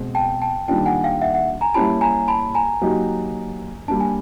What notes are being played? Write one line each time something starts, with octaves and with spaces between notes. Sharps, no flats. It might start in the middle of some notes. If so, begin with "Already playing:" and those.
Already playing: B2 G#3 C4
G5 A5
G5 A5
D#3 G3 A#3 D4 F4 G5 A5
F#5 G#5
F5 G5
E5 F#5
E5 F#5
G#5 A#5
G3 A#3 C#4 E4 G4 A5 B5
G#5 A#5
A5 B5
G#5 A#5
F#3 A#3 D#4 G4
G3 A#3 D4 A5
G#5